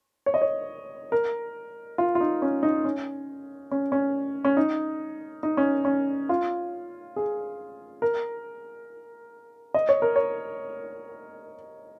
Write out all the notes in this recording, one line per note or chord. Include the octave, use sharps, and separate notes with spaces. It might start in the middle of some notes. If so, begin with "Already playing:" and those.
C#5
D#5
C#5
A#4
F4
F4
D#4
C#4
D#4
C#4
C#4
C#4
C#4
D#4
D#4
C#4
C#4
F4
G#4
A#4
D#5
C#5
A#4
C#5